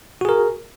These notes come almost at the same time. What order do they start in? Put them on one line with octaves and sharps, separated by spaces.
F#4 G#4 A#4